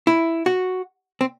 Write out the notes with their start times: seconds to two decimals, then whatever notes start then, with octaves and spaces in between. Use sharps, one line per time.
0.07 E4
0.46 F#4
1.21 C4